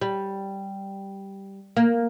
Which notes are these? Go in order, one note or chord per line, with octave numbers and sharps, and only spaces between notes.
G3
A#3